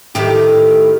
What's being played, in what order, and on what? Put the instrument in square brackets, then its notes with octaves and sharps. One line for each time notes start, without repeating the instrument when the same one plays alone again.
[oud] A2 D#3 G4